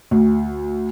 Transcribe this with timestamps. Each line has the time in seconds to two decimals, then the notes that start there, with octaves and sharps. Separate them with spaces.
0.11 D2